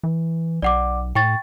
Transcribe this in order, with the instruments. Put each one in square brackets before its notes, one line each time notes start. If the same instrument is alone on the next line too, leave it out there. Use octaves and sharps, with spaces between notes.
[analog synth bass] E3
[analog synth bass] B1 [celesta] D5 F#5 D6
[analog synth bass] A2 [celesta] G5 C#6 A6